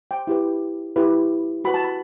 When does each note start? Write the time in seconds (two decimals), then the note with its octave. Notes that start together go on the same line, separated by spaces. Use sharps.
0.11 G5
0.27 E4 G4 B4
0.96 E4 G4 B4
1.65 F#4 B4 B5
1.74 A5
1.84 B5